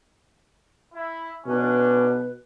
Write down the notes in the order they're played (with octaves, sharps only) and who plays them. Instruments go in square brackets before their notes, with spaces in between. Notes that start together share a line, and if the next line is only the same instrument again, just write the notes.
[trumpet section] E4
[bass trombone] B2 [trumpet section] C#4 D4 [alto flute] B4